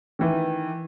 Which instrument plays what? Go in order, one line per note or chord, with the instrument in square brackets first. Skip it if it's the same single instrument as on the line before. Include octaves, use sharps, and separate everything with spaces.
[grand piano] D#3 E3